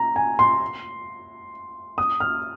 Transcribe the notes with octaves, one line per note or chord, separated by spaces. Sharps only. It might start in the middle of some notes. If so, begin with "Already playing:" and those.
Already playing: A#5
G#5
C6
D#6
F6